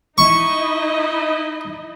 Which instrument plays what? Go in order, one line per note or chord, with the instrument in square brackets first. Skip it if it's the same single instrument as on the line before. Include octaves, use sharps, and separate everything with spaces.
[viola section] D#4 E4 D#5 [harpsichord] C#6